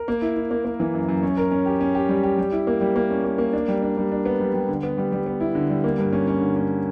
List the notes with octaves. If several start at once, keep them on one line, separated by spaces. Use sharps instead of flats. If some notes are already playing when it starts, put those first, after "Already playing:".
Already playing: A#4
A#3
E4
E4
A#3
A#3
E3
F#2
F#2
C#4
A#4
C#4
G4
C#4
G4
G3
G4
G3
E4
A#3
G3
A#3
C#4
A#3
A#3
D4
G3
D4
G3
D4
B3
G3
G3
D3
B3
G3
G3
B3
E4
D3
G3
A#3
G2
C#4
C#4
D3
C#4